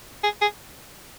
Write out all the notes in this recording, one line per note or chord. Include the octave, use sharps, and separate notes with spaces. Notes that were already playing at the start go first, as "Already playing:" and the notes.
G#4
G#4